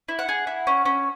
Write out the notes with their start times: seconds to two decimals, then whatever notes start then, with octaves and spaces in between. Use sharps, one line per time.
0.09 E4
0.19 F#5
0.29 G#4
0.47 E4
0.67 C#4
0.85 C#4